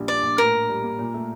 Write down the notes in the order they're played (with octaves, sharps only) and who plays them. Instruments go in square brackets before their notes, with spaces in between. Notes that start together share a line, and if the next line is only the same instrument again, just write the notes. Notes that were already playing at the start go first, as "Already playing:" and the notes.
Already playing: [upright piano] A#1 G3
[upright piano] D4 [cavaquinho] D5
[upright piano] A#1
[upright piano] A2 [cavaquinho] A#4
[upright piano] A2
G3
A#3
A#2
A3